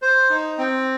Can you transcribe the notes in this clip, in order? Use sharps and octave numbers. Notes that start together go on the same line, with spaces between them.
C5
D#4
C4